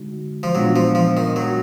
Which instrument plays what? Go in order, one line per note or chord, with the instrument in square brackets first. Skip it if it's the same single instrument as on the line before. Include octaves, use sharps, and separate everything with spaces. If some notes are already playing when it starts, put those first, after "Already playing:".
Already playing: [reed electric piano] D3 G#3 D#4 F#4
[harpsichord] F3
[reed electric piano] A#2 G#3 B3 D4 F4 [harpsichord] F#3
[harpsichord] F3
F3
D#3
F#3